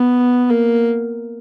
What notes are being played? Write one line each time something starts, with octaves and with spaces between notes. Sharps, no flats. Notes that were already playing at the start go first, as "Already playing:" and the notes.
Already playing: B3
A#3